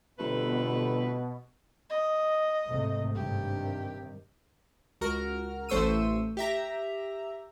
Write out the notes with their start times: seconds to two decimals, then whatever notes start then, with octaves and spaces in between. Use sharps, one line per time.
0.19 G1 B2 A3 C4 B4
1.90 D#5
2.67 G#1 C3 A3
3.16 G2 C3 D#3 G4
5.01 C#2 F#4 A#4 A#5 F6
5.69 A1 A3 C5 C#6 E6 D#7
6.37 G4 E5 A#5